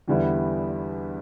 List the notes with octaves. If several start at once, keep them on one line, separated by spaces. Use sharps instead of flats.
E2 D3 G3 B3 E4